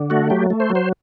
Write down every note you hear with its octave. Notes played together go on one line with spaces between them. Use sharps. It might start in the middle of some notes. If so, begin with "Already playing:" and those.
Already playing: D3
A3 F#4
F#3 G4
A3
C5
F#3
C5